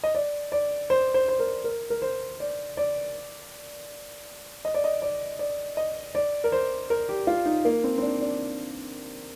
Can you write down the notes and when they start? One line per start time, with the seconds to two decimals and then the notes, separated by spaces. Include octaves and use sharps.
0.04 D#5
0.15 D5
0.52 D5
0.90 C5
1.14 C5
1.28 C5
1.39 A#4
1.64 A#4
1.90 A#4
2.02 C5
2.40 D5
2.77 D5
4.65 D#5
4.74 D5
4.84 D#5
5.02 D5
5.39 D5
5.77 D#5
6.15 D5
6.44 A#4
6.52 C5
6.90 A#4
7.09 G4
7.27 F4
7.46 D#4
7.65 A#3
7.84 C4
7.98 C4
8.02 D4
8.21 D4